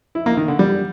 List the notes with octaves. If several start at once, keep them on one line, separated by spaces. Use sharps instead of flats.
E4
A#3
D#3
D3
G3